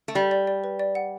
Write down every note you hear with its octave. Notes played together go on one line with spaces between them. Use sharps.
A3
G3 D5
D5
D5
B4
D5
F#5